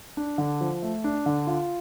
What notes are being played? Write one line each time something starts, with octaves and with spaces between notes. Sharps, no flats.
D4
D3
F3
A3
D4
D3
F4